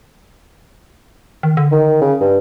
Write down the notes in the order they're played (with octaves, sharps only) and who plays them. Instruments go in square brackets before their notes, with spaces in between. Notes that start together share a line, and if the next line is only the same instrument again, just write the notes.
[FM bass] D#3
D3
[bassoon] D#3
C#3
G2